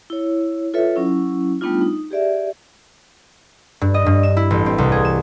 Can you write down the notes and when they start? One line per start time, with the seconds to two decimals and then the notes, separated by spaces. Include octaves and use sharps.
0.10 E4 C#5
0.74 F4 A4 B4 C#5 E5
0.96 F#3 C#4 E4
1.61 G3 A3 B3 D4 D#4 F4
1.81 D#4
2.11 G4 G#4 D5 E5
3.81 G2
3.94 D#5
4.06 G2
4.23 E7
4.37 E4
4.51 A1
4.66 C4
4.78 C2
4.92 G#4
5.05 E7